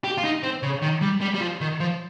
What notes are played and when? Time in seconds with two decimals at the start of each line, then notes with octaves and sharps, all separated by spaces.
0.04 G4
0.18 F4
0.24 D#4
0.43 C4
0.62 C#3
0.82 D#3
1.02 G3
1.21 G3
1.34 G3
1.41 F3
1.61 D#3
1.80 F3